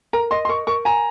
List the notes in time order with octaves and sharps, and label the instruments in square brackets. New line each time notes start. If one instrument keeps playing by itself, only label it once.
[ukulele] A#4 [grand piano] A#5
[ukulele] D#5 [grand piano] C6
[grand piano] C6
[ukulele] A#4 [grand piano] C#6
[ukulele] A#4 [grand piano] C#6
[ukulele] G#5 [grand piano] A#5